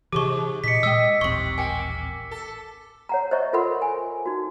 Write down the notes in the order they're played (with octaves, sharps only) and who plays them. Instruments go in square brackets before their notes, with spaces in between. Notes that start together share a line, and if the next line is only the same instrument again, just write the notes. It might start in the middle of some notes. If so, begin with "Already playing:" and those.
[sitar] G#2 [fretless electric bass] C3 E3 [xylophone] G4 G#4 C#6 [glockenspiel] D6
[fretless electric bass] A#2 [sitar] D#4 [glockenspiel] B6 C#7
[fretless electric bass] A#2 G#3 [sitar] D#5 [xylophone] G5 D#6 [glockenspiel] E6
[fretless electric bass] D#1 A1 C4 [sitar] C3 [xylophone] C#6 F#7
[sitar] A#3 [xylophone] G5 G#5
[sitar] A4
[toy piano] C#5 F#5 A#5
C5 C#5 D#5 E5 C#6
F4 A4 A#4 F#5 B5 C6
G#5
D#4 F#4